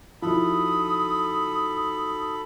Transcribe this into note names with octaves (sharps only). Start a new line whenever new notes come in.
F3 D#4 E4 F#4 A4 B5 D#6